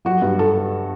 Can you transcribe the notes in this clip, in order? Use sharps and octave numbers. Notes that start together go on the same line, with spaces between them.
F#3 F#4
G2
A4